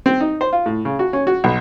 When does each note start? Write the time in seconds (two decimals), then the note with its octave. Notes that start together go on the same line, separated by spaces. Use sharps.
0.06 C4
0.20 D#4
0.41 C5
0.53 F4
0.66 A2
0.85 C#3
0.99 F#4
1.13 C#4
1.27 F#4
1.44 B1